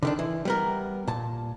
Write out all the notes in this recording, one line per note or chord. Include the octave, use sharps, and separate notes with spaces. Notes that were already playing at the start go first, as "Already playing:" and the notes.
D3 D#3 D4
E3
G3 B3 A#4
A#2 A5